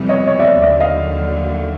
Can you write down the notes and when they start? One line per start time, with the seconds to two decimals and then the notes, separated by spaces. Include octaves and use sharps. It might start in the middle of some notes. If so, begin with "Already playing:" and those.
Already playing: F2 C3 E3 G3
0.09 C#5 D#5
0.27 C#5 D#5
0.39 D5 E5
0.62 D#2 D3 F#3 D5 E5
0.80 D#5 F5